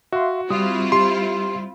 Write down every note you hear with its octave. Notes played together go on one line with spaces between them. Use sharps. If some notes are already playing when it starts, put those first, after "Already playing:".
F#4 E5 F5 C6
G3 C4 E4 F4 D#6
G4 C6